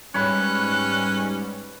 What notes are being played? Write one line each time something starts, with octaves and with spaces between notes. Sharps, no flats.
G#2 G3 C#4 B4 C#5 F#6